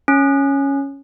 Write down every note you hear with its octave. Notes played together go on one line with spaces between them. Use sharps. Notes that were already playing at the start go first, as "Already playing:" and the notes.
C#4